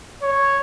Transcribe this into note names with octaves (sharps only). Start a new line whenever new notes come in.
C#5